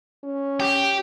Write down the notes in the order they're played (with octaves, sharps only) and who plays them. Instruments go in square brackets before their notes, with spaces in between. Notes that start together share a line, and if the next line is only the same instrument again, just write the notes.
[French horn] C#4
[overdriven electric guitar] G4